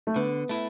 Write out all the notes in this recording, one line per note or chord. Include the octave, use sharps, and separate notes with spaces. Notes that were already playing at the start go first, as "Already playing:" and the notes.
A3
D3 B3
A3 E4